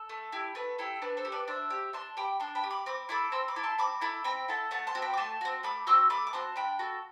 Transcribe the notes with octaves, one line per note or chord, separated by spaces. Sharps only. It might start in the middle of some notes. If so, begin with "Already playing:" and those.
Already playing: A4
A3
E4 G4
A3 B4
E4 G4 A4
D4 B4
A4 C5
G4
B4 D5
D4 C5 E5
G4
D4 A5 C6
G4 G5 B5
D4 A5 C6
G5 B5
G4
B5 D6
C4 B5 D6
E4 A4 B5 D6
C4 C6 E6
B5 D6
E4 A4
A5 C6
C4 B5 D6
E4 A4 B5 D6
C4 G5 B5
E4 A4 F#5 A5
A3 F#5 A5
A5 C6
C4 F#4
G5 B5
D6
A3 A5 C6
C4 F#4
A3 B5 D6
C4 F#4 C6 E6
A3 B5 D6
D6
C4 F#4 A5 C6
D4 G5 B5
F#4 A4